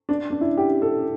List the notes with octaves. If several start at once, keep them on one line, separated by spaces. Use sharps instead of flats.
D4
D4
E4
G4
A4